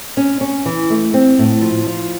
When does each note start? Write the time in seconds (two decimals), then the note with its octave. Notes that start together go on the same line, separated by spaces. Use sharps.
0.17 C#4
0.41 C#4
0.66 E3
0.90 A3
1.14 C4
1.38 A2
1.62 F3
1.87 F3